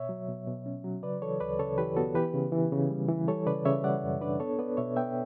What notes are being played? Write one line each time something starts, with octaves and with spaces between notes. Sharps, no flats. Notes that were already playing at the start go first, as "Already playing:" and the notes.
Already playing: B2 C#5 E5
F#3
B2
B2
C#4
F#3
C#3 B4 D5
E3 A4 C#5
D2 B4 D5
C#3 A4 C#5
E3 G4 B4
B3 F#4 A4
E3 G4 B4
C#3
E3
C#3
G3
E3
G3 A4 C#5
C#3 B4 D5
C#3 C#5 E5
G3 D5 F#5
F#2
D4 B4 D5
B3 A4 C#5
B3 B4 D5
B2 C#5 E5
B3 E5 G5